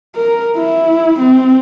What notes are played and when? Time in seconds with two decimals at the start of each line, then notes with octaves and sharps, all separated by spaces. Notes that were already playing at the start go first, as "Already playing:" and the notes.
0.16 A#4
0.57 E4
1.19 C4